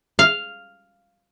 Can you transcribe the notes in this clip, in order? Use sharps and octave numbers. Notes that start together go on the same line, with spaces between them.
F5